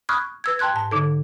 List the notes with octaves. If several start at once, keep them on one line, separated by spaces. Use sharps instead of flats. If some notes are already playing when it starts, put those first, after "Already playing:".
B5 C#6 D#6 F6 F#6 G#6
B4 E6 G#6
G5 A5 C6 F#6 G#6
G#2 A5
D3 D#4 A4